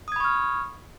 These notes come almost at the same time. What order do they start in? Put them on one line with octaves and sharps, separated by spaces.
D#6 G#6 B5 C#6 F6